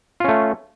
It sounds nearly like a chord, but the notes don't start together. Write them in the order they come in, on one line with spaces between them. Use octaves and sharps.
F4 C#4 A3